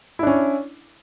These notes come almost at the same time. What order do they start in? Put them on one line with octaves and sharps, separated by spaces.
E4 D4 C#4